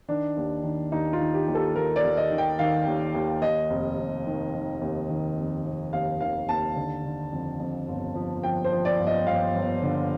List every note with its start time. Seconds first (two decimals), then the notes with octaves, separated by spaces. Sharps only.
0.08 D#3 D4
0.37 D#2
0.63 D#3
0.92 D#2 D#4
1.13 F4
1.20 D#3
1.34 G4
1.48 D#2
1.55 A4
1.75 D#2 A#4
1.96 D5
2.04 D#2
2.17 D#5
2.31 D#3
2.38 G5
2.59 D#3 F5
2.86 D#2
3.15 D#2
3.42 D#2 D#5
3.70 F1
3.98 F1
4.27 D#3
4.54 D#3
4.82 D#2
5.09 D#3
5.37 F1
5.65 F1
5.93 D#2 F5
6.21 D#3 F5
6.48 D#2 A5
6.76 D3
7.05 D3
7.33 F2
7.60 F2
7.88 G1
8.15 F3
8.43 F3 G5
8.64 C5
8.72 F3
8.85 D5
8.99 G1
9.07 D#5
9.27 G1 F5
9.55 G1
9.82 D3